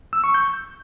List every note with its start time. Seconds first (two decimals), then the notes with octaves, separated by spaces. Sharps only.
0.13 E6
0.24 C#6
0.34 G6